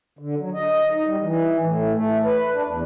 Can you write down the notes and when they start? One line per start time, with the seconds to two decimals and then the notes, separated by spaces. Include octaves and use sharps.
0.19 D3
0.38 F#3
0.54 D#5
0.91 D#4
1.06 G3
1.21 E3
1.61 A2
1.94 A3
2.24 B4
2.53 D4
2.68 E2